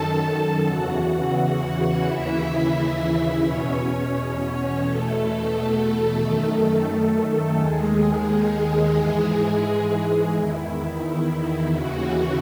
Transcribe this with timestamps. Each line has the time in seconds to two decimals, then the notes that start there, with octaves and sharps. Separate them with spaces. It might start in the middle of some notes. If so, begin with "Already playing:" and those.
Already playing: F#2 D#3 A4 A5
0.67 E2 C#3 E3 F#4 F#5
2.05 D#2 C#3 E3 E4 E5
3.43 E2 B2 C#4 C#5
4.82 E2 B2 A3 A4
6.20 F#2 D#3 A3 A4
7.58 D#2 D#3 G#3 G#4
8.96 G#2 E3
10.35 E2 D#3 E4
11.73 D#2 C#3 E3 F#4